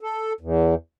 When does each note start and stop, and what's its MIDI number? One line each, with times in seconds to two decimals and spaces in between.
0.01 0.33 69
0.40 0.75 40